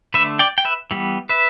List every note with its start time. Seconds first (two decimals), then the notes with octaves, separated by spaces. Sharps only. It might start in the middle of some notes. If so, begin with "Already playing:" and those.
0.14 D3 A3 B4 E5
0.39 D5 G5
0.58 G5
0.65 B4 E5
0.91 E3 G3 B3
1.29 B4 E5